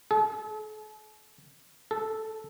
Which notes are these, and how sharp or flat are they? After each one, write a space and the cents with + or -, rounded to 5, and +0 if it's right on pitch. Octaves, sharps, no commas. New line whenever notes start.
A4 -45
A4 -5